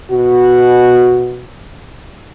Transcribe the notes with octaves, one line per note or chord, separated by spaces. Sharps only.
B2 F#4